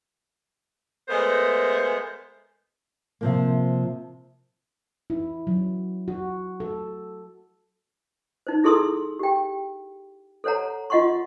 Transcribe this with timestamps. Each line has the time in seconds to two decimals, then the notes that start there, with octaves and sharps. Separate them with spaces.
1.07 G#3 A3 B3 A#4 C5
3.21 C3 F3 A#3
5.10 E4
5.47 F#3
6.08 F#4
6.60 A4
8.47 D#4 C5
8.64 E4 G#4 A4 C6 D#6 E6
9.19 G4 G5
10.44 A4 C5 C#5 F#5 A#5
10.90 F4 D#5 F#5 C6 C#6